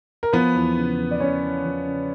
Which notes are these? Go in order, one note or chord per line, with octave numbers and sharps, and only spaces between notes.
A#4
F3 B3 B4
E2
C#3
E2
D5
E2 C#4 C#5
E2
F3
C#3